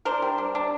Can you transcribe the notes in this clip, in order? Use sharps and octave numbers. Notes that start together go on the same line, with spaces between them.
D4 A#4 C5
G3
D4
D4